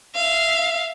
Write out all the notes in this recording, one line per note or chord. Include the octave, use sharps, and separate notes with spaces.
E5 F5